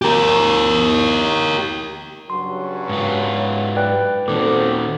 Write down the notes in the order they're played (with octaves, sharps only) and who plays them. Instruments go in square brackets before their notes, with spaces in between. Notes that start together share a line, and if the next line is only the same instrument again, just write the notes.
[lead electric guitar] G4 A#4
[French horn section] G2 C#3 F#3 [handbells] C6
[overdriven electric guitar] G#2 F4
[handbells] B4 D5 G5
[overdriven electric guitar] A#2 D#3 [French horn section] F#3 C4 A4 [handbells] D6